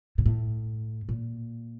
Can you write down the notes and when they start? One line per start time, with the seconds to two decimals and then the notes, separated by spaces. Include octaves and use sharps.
0.18 A#2
0.26 A2
1.09 A#2